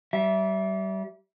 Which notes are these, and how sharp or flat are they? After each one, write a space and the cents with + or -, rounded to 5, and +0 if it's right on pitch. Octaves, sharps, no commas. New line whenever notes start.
G3 -30 E5 +0